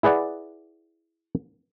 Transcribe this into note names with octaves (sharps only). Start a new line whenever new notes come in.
E4 G#4 B4 D5 F#5